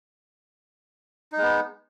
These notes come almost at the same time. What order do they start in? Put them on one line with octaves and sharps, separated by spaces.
D#4 G#3 B3